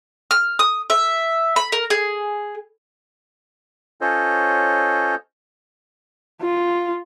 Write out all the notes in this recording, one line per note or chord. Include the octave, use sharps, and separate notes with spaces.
F6
D#6
E5
B5
A#4
G#4
C#4 F4 A4 C5 C#5 D#5
F4